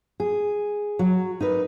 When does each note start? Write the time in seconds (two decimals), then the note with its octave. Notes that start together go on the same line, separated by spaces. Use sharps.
0.20 G#4
0.99 F#3
1.41 D#4 A#4 B4